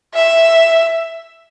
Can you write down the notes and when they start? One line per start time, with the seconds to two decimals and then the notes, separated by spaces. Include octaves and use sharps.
0.14 E5